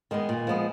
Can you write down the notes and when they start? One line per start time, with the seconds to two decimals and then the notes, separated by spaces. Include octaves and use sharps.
0.11 D#3 G#3 B3
0.29 A#2
0.47 F3 G#3 B3